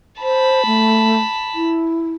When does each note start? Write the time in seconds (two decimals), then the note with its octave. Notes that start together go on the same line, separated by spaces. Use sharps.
0.22 C5 A5 B5
0.66 A3
1.55 E4